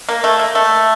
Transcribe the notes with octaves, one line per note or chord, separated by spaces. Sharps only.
A#3
A3
A#3
A3